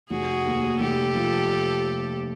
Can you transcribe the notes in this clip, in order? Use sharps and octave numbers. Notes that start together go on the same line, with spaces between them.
F1 F#4 G#4
D#2
F1 G4 A4
F3